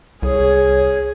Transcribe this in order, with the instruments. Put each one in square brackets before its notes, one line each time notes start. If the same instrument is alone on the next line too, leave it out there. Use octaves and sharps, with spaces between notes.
[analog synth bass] C2 [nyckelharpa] G#4 [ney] C#5